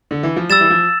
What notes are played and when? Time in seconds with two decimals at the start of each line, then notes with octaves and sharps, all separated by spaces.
0.11 D3
0.23 E3
0.36 F3
0.49 G3 E6 A6 E7
0.61 E3
0.70 F3